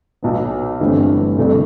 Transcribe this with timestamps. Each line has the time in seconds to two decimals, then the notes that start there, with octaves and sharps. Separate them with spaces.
0.22 B1 B2 B3
0.80 G1 G2 E3 A3 C4
1.38 C2 B2 A3 D4 A4